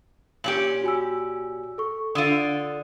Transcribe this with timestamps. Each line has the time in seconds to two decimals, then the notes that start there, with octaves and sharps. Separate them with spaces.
0.44 A#2 C#4 G4 F#7
0.84 F#4 G#5 E6
1.78 A4 C#6
2.15 D3 F4 D#6 D7 D#7